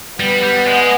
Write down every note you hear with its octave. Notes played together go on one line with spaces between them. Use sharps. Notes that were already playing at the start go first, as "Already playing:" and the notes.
G3 B3
G3
G#3